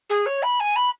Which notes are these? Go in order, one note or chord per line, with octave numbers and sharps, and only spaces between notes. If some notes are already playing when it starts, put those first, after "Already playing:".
G#4
C#5
B5
G#5
B5